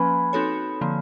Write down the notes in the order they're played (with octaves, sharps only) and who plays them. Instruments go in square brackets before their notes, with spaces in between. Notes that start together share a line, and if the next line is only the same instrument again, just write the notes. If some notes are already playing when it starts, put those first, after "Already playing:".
Already playing: [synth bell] F3 A#3 C#4 [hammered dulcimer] G#4 B4
[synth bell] C4 D#4 F#4 A4 C#5
D3 F3 A#3